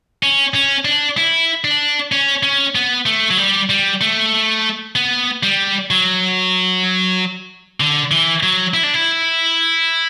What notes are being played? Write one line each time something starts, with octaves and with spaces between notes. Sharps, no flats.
C#4
C#4
D4
E4
D4
C#4
C#4
B3
A3
F#3
G3
G3
A3
B3
G3
F#3
D3
E3
F#3
E4
D4
E4